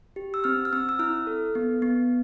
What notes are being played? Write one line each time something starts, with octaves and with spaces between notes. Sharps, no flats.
G4
E6
C4 F6
F6
C4 E6
E6
E4 F6
A4
B3
B3